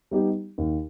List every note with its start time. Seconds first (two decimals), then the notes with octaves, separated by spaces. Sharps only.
0.11 G3 B3 D#4 G4
0.58 D#2